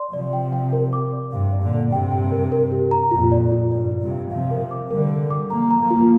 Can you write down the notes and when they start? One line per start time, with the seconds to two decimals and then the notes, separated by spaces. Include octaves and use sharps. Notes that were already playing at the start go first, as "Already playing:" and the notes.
Already playing: D5 C6
0.13 C3 F3 D5
0.33 G5
0.53 G5
0.73 A#4
0.93 D6
1.12 D5
1.32 G2 C3 F5
1.52 D5
1.62 A#2 D3
1.73 D5
1.92 G2 C3 G5
2.12 G5
2.32 A#4
2.52 A#4
2.72 G4
2.91 A#5
3.11 F2 A#2 F4
3.32 D5
3.52 F4
3.71 G2 D5
3.91 F4
4.02 G2 C3
4.11 F5
4.31 C3 F3 F5
4.51 A#4
4.71 D6
4.90 D3 G3 A#4
5.11 A#4
5.30 D6
5.50 F3 A#3 A#5
5.71 A#5
5.80 F3 A#3
5.91 F4